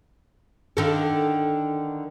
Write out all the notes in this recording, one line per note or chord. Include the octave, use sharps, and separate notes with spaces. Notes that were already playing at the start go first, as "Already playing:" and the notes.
D3 D#3 A4